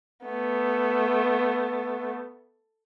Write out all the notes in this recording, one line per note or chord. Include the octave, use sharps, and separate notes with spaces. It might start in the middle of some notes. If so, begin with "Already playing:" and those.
A3 B3